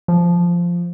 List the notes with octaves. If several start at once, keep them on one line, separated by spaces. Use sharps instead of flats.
F3